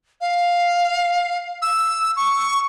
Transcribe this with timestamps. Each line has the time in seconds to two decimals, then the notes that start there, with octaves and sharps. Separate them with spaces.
0.21 F5
1.62 E6
2.17 C#6